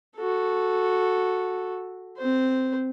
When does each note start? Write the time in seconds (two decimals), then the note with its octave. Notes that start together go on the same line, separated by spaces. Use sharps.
0.17 F#4 A4
2.18 C4 C5